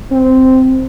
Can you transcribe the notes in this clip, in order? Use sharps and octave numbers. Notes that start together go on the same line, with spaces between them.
C4